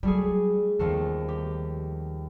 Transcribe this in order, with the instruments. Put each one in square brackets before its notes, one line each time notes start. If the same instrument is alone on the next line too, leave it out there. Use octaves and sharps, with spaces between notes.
[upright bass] F#3 [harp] G3 A3 G#4
[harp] D#2 F3 A3 [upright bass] B3
[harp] G4